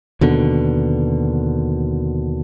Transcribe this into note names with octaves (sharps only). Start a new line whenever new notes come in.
D#2 B2 D3